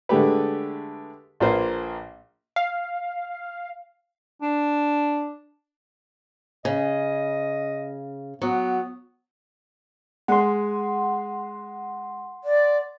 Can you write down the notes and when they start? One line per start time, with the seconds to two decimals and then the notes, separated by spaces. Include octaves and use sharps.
0.09 D3 G#3 A3 G4 B4
1.40 A#1 A#3 F4 B4 C5
2.56 F5
4.42 D4
6.65 C#3 D#5
8.42 F#3 B3
10.28 G#3 G#4 F#5 C6
12.44 D5